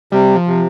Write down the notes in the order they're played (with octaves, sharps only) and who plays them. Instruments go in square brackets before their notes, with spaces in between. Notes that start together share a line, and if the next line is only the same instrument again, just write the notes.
[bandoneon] C3 [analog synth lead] G3
[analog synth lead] F3
[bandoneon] C3